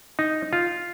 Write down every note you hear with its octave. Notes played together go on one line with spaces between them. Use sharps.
D#4
F4